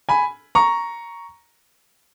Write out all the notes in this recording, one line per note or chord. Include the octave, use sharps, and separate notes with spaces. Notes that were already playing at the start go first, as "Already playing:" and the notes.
G#5 B5
A#5 C#6